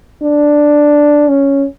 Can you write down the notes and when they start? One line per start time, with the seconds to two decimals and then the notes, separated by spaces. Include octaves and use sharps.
0.22 D4
1.28 C#4